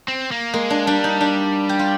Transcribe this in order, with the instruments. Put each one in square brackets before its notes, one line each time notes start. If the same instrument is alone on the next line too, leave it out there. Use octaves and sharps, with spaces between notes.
[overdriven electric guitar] C4
A#3
[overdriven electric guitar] G#3 [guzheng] A#3
[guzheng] D4
[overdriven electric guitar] G3 [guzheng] D4
[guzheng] D#4
D4
G4
F4